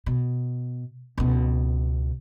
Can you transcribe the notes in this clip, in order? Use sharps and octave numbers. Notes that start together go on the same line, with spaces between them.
B2
C#2 B2